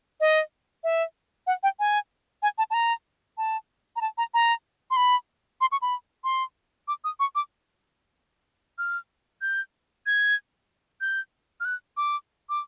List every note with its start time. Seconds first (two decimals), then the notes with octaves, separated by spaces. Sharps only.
0.20 D#5
0.84 E5
1.47 F#5
1.63 G5
1.79 G#5
2.43 G#5
2.58 A5
2.71 A5
2.74 A#5
3.38 A5
3.96 A#5
4.01 A5
4.18 A#5
4.34 A#5
4.91 C6
4.97 B5
5.61 C6
5.72 C#6
5.82 B5
6.24 C6
6.88 D6
7.04 D#6
7.20 C#6
7.35 D6
8.78 F6
9.42 G6
10.06 G#6
11.01 G6
11.60 F6
11.65 F#6
11.97 D6
12.49 D6